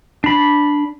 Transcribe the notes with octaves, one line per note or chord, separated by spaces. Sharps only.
D4 B5